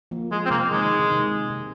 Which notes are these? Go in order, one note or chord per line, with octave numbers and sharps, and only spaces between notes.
F3 A#3
F3 G#3
C4
C3 A#3
D#3 G#3
D#3
C3
C3